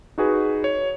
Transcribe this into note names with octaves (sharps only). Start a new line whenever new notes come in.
D#4 F#4 G#4 B4
C#5